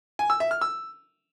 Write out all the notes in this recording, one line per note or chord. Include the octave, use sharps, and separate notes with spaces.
G#5
E6
E5
F6
E6